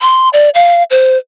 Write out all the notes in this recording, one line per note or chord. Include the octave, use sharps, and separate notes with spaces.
C6
D5
F5
C5